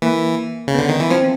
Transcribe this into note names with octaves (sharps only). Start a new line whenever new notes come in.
E3 A#3
C#3
D3 B3
D#3
E3
F3 C4